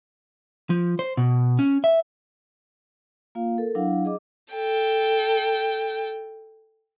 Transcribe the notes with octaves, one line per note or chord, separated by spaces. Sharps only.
F3
C5
B2
C#4
E5
A#3 F4 F5
A4 A#4
F#3 D4 E4 F5 F#5
G#4 D#5 D6
A4 G5